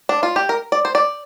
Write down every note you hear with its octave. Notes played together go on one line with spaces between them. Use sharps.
D4
F4
G4
A#4
D5
C5
D5